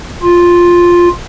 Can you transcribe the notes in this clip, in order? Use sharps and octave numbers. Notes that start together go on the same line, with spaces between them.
F4